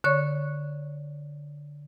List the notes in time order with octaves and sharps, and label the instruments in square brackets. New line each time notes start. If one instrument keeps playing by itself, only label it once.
[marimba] D3 C#5 C#6